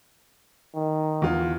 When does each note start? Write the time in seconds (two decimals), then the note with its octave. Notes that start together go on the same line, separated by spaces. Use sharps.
0.76 D#3
1.22 E2 F4